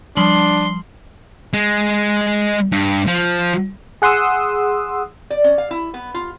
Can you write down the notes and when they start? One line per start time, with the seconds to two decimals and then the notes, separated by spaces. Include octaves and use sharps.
0.17 F3 G3 D4 C6 F#7
1.53 G#3
2.72 G2
3.07 F3
4.02 G#4 F#5 C6 D#6 E6
5.30 D5
5.44 C#4
5.58 F5
5.71 E4
5.94 B3
6.14 F4